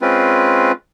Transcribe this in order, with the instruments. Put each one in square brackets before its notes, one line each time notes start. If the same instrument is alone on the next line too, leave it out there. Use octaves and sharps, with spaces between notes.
[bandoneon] G#3 C4 C#4 F4 B4